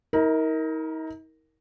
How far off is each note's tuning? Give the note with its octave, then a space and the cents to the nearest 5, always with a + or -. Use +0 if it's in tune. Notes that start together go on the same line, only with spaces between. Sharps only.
D#4 +40 A#4 +0